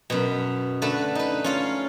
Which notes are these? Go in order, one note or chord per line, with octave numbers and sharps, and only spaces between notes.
F#2 B2
D3 A3 A4 B4
D#4 B4
C#4 F4 F5